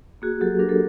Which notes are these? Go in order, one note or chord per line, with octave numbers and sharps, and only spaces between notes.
A#3 F#4 G#4
F#3 G4 A4
D4 A#4
A4